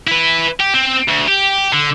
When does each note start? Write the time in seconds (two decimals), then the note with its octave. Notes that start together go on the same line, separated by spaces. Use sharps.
0.07 E4 B4
0.60 G4
0.74 C4
1.08 D2
1.27 G4
1.73 D3